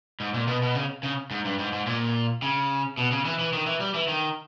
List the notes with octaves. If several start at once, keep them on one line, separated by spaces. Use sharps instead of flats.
G#2
A#2
B2
B2
C#3
C#3
G#2
G2
G#2
G#2
A#2
C#3
B2
C#3
E3
E3
D#3
E3
G3
E3
D#3